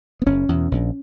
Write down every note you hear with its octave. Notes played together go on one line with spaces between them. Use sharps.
B3
F#1 C#4
E2 B2
A#1